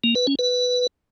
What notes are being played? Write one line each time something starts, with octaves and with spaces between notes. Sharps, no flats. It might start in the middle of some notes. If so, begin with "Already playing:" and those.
A#3
B4
C#4
B4